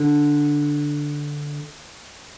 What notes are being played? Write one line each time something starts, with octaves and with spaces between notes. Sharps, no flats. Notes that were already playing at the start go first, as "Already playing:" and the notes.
Already playing: D3